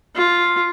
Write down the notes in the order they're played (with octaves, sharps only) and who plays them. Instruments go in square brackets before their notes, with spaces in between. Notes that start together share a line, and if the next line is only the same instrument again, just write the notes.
[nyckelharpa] F4